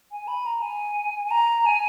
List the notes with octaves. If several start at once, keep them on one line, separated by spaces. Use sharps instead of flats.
G#5
B5
A#5
G#5
G#5
A#5
G#5